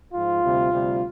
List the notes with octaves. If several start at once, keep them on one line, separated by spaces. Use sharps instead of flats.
G#2 F3 F4
D2 C3 G3
D2 C3 G3